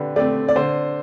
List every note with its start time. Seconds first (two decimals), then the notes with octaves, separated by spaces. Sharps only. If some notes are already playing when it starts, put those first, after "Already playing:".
Already playing: D3 A3 C4 G4 B4
0.16 A3 C4 D5
0.48 D5
0.56 D3 C5